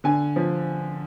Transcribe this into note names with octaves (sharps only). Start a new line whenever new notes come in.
D3 G#5
F3